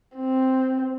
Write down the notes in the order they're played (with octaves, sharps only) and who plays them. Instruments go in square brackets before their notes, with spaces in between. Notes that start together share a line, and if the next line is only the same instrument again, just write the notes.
[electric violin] C4